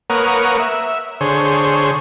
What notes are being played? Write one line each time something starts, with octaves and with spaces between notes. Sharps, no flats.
A#3 A#4 B4 C#5 F#5 D#6
E5
D3 G#4 C5 C#5